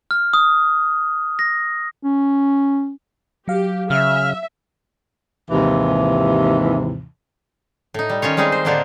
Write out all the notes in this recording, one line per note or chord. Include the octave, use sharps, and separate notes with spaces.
F6
D#6
A#6
C#4
F#3 G4 F5
C#3 E5 F6
D#2 G#2 C3 E3
A2 D#4
G3
D#3 C#4 F4 C#5
G3 G#3 C4 D#4 G#4
C5
A2 D3 A#3 D4 D#4 F4